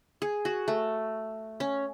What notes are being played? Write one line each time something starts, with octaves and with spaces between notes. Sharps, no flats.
G#4
F#4
A3
C#4